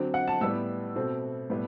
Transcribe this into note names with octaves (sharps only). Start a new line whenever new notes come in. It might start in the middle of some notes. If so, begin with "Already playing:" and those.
Already playing: D3 F#3 C4
F#5
A5
A2 G3 B3 E6
B2 A3 C4
A2 G3 B3